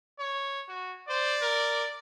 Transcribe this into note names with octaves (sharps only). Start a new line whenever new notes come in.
C#5
F#4
C5 D5
A#4